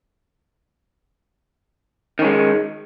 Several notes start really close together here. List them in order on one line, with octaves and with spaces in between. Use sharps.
D#3 C#4 G#3